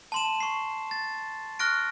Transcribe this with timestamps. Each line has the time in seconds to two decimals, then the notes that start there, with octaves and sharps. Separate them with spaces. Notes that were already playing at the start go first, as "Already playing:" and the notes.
0.12 A5 C6 E7
0.40 C#6 C7
0.91 A6
1.59 C#6 F6 F#6 A#6 D7